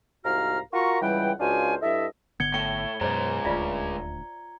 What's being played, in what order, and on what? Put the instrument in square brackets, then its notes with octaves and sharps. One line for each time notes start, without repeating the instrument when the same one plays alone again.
[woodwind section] C2 G#2 F#4 F5 A#5 F6
F4 F#4 A#4 A#5 C#6
C#2 E3 G3 F#5 G5
C#2 D4 F#4 C5 F5 G#5
G2 E4 A4 D#5 E5
[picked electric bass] G#1 D3 B3 [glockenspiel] G#6 C#7 G7
[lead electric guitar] A2 [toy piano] G5 [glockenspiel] C#7 G7
[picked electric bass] F#2 B2 [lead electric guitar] G#3 C#4 [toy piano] C5 C#5 D#5 [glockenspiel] A#5
[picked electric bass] D#1 D2 [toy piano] F4 D5 E5